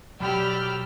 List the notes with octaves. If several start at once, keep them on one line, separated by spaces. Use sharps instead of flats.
B2 F#3 G4 D5 G5 B5 E6 F6